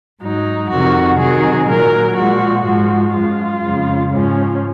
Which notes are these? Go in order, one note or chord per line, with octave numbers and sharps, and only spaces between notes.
G#2 F#3 D#4
F2 C3 D#3 F#4
C3 D#3 F#3 G#4
A#2 F#3 A#4
A#2 F3 G#3 F#4
G#2 F3 G#3 F#4
F#2 F3 G#3 F4
F2 C#3 F3 G#3
G#2 F3 G#3 C#4